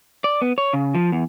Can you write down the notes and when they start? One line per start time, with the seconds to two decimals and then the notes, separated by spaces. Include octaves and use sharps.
0.24 D5
0.42 B3
0.58 C#5
0.73 C#3
0.95 F3
1.12 E2